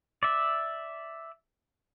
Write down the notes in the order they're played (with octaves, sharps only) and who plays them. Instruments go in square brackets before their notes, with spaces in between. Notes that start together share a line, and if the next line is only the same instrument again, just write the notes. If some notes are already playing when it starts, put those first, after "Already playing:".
[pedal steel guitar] D5 E5